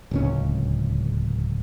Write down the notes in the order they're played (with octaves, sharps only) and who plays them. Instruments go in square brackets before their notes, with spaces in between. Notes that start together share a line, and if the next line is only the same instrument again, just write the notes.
[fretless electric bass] D1 C#2 C#4